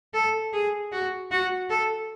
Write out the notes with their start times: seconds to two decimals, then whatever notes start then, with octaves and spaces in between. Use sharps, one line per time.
0.14 A4
0.54 G#4
0.92 F#4
1.31 F#4
1.70 A4